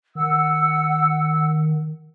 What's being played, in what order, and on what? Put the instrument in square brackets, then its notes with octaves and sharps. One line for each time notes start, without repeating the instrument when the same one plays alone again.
[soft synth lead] D#3 [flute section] F#5 E6